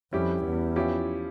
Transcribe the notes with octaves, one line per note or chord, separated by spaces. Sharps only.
F2 G3 C#4 E4 G4
E2
F3 C#4 E4 G4